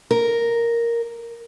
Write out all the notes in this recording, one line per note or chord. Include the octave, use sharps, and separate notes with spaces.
A#4